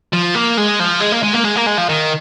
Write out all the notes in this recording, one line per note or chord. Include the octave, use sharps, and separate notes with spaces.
F3
A#3
G#3
F3
G#3
A#3
G#3
A#3
G#3
A#3
G#3
F3
D#3